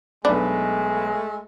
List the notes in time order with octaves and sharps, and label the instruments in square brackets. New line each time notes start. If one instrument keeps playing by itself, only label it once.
[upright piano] B1 B4 B5 [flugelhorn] G#3 [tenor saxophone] A3 [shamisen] D4